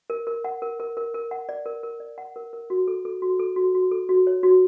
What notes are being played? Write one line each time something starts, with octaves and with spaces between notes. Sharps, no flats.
A#4
A#4
F#5
A#4
A#4
A#4
A#4
F#5
D5
A#4
A#4
D5
F#5
A#4
A#4
F#4
A4
A4
F#4
A4
F#4
F#4
A4
F#4
C#5
F#4